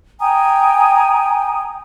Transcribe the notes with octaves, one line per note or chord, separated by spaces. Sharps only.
G5 G#5 A#5 D#6